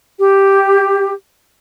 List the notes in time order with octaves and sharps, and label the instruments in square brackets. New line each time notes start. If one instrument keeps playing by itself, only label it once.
[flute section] G4